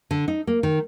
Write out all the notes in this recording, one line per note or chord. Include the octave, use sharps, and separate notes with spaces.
D3
D#4
A#3
D#3